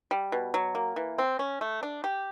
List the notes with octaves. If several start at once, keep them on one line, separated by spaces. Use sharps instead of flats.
G3
B2
F#3
A#3
E3
C4
C#4
A3
D4
G4